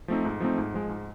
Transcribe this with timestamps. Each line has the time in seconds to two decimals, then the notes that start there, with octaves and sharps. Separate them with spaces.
0.08 F3 A3 C4 D#4
0.25 G#2
0.40 F3 A3 C4 D#4
0.58 G#2
0.74 F3 G#3
0.89 G#2